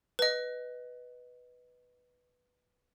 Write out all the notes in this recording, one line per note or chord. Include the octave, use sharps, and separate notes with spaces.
B4 D#5